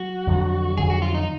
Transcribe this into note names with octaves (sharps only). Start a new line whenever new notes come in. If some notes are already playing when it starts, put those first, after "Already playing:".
Already playing: F#3 F#4
F2 D3 F#3
F2 D3 F#3 G#4
F#4
F4
D#4